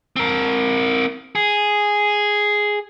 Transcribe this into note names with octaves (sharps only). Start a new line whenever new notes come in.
C4 A#4
G#4